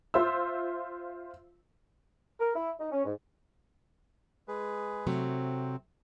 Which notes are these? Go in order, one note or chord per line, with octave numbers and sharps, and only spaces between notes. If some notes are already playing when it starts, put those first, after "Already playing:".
F4 C5 E5 E6
A#4
E4
D#4
C#4
G#2
G#3 G#4 B4
C3 F#3 A3 C4